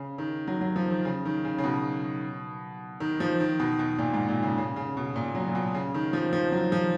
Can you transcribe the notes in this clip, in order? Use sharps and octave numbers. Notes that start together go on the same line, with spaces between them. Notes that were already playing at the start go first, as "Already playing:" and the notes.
Already playing: C#3
D#3
F#3
F#3
F3
D#3
C#3
D#3
C#3
C#3
B2
D#3
F3
D#3
B2
B2
A#2
G#2
A#2
C#3
C#3
C#3
B2
A#2
F#3
A#2
B2
C#3
D#3
F3
F3
F#3
F3